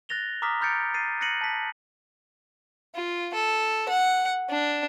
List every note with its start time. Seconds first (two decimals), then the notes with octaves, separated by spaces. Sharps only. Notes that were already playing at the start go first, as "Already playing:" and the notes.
0.09 F#6 A6 A#6 F7 G7
0.42 A#5 D6 D#6 F6 B6
0.61 B5 F6 G6 A6 C#7 D7
0.94 A6 C7 D#7
1.21 F#6 A#6 C7 C#7 D#7 F#7
1.41 A5 B6
2.95 F4
3.34 A4
3.89 F#5
4.50 D4